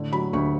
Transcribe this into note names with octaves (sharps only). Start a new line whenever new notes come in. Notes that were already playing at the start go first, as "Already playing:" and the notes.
Already playing: A2 D3
F#3 B5
D2 C#6